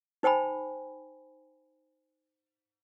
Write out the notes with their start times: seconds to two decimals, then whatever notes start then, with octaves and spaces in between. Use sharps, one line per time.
0.23 D#4 C5 G5 G#5 B5